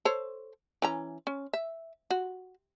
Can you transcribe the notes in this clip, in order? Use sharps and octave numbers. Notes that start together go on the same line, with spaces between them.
A4 C5 C#5
E3 C#4 A#5
C#4
E5
F#4